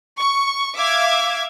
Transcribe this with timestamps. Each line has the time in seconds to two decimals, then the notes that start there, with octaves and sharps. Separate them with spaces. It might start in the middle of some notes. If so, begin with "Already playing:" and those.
0.19 C#6
0.75 E5 F5 D6 G#6